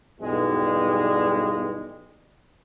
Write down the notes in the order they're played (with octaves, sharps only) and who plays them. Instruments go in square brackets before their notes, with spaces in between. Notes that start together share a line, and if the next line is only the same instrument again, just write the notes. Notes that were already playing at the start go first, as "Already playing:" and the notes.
[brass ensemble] B1 E2 G2 G3 G#3